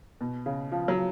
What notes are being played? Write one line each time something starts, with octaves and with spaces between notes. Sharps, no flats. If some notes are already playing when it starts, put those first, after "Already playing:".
B2
C#3
F3
F#3